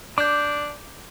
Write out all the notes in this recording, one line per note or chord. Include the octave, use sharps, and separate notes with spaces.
D4 D6 G6